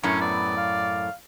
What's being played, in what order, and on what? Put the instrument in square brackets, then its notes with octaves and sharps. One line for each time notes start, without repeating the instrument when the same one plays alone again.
[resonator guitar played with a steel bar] F#2 A2 [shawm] C#4
[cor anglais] B3 [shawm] D5
[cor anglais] F5